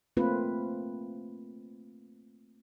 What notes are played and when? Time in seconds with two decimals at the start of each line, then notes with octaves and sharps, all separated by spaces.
0.17 A3 A#3 C4 F4 B4